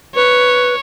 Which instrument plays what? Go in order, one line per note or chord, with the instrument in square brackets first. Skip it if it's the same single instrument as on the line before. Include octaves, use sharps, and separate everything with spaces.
[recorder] B4 [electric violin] C#5